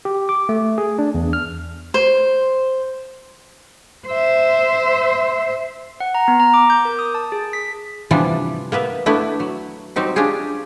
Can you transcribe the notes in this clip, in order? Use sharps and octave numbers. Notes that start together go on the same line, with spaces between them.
G4
D6
A3
G#4
D4
E2
F6
C5
C5 E5
F#5
A#5
B3
A#5
D6
G6
A#4
D#6
A5
G#4
B6
C3 E3 F3 G3 B3 D4
A#3 B3 B4 E5
A3 B3 D4 E4 B4
F#3
F#3 G3 C4 D#4 G4
C#4 D4 F4 G4 G#4